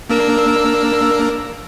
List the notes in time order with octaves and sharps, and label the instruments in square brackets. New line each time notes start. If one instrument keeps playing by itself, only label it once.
[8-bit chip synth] A#3 D4 A#4 [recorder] E6